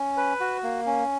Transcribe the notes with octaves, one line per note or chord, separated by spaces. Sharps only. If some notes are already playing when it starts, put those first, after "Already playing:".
Already playing: C#4
B4
F#4
A#3
C#4